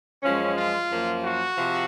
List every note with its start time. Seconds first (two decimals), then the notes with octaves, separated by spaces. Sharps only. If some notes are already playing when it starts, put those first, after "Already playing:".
0.22 F#2 F3 G#3 C#4
0.56 F4
0.89 F#2 F3 A#3
1.24 F#4
1.57 C3 F3